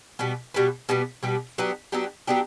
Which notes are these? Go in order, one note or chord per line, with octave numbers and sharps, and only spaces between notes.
B2 G3 B3
B2 G3 B3
B2 G3 B3
B2 G3 B3
F#3 B3 D4 G4
F#3 B3 D4 G4
F#3 B3 D4 G4